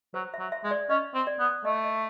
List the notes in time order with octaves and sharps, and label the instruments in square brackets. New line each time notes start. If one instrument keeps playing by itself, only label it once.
[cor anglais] F#3 [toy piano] C5
[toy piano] E5
[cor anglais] F#3
[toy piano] E5
[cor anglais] G#3
[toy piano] D5
[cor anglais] C#4 [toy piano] D#5
[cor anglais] C4
[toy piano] D5
[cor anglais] B3
[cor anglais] A3 [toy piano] D#5
[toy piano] D#5